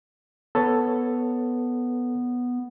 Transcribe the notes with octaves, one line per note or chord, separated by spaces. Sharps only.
B3 A4 B4 C#5